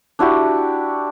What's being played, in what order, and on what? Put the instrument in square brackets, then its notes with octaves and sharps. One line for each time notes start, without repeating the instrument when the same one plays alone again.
[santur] D4 E4 F#4 G4